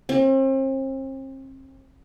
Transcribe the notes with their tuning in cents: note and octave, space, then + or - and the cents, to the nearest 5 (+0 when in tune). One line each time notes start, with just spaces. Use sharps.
C4 +40